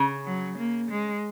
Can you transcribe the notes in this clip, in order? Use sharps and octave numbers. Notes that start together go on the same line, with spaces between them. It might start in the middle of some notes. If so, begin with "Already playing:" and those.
Already playing: C#3
F#3
A#3
G#3